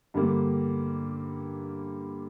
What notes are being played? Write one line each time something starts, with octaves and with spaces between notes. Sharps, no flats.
G2 D3 G3 A#3